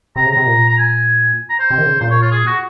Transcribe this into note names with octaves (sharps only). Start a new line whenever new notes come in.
C3 A#5
C#3
A#5
C3
A#2
A#5
G#5
A#5
C5
C3
D#3
C#3
A#2 C5
C#5
F4
G#4
F#4